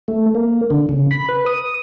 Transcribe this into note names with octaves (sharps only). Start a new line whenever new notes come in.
A3
A#3
D3
C#3
B5
B4
D#6